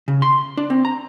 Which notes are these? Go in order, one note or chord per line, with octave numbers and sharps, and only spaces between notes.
C#3
C6
D4
C4
A#5